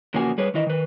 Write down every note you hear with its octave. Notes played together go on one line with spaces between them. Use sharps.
E2 C#3 F3 A#3 F#4 G#5
G3 G#4 B4 C#5
D#3 E3 D#5
D#3 B4